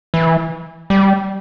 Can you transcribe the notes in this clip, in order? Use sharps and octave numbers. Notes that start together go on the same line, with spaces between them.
E3
G3